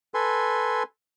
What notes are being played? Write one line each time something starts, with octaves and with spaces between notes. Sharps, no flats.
A4 B4 G#5 C6